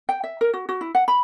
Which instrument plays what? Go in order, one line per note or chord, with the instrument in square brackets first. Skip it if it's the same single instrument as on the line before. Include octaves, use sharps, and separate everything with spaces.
[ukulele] G5
E5
A#4
F#4
F#4
E4
F#5
B5